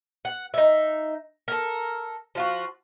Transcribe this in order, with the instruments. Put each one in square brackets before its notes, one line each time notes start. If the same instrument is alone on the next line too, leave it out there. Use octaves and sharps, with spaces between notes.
[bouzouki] F#5
D#4 E5
A4 A#4
F3 F4 F#4